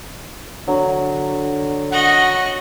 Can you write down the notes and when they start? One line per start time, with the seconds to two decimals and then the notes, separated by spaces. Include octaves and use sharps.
0.68 D3 F#3
1.92 F#4 D#5 F#5